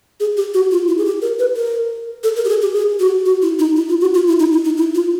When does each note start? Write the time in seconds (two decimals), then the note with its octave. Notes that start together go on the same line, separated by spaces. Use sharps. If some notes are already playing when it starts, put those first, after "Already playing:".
0.20 G#4
0.37 G4
0.54 F#4
0.71 F4
0.88 E4
0.98 G#4
1.05 G4
1.22 A#4
1.39 B4
1.56 A#4
2.24 A4
2.36 A#4
2.45 G4
2.49 G#4
2.62 G4
2.74 G#4
3.00 F#4
3.26 F#4
3.42 E4
3.59 D#4
3.76 E4
3.89 F4
4.01 F#4
4.14 F4
4.27 E4
4.39 D#4
4.52 E4
4.65 D#4
4.77 E4
4.95 F4